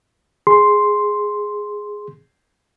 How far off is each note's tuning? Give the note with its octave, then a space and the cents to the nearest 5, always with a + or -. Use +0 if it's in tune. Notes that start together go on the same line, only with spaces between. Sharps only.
G#4 +0 C6 +0